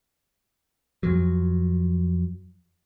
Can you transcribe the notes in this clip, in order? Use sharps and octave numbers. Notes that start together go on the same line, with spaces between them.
F2 F3 F#3